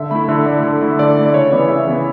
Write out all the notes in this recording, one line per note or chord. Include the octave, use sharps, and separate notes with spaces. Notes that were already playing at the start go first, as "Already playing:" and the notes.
Already playing: D3 E5
A3 E4 B5
D3 E5
A3 E4 D5
D3
A3 E4
D3 D5
A3 E4
D5
C#3 C#5
E3 B3 E4 D5
C#3 E5
E3 B3 E4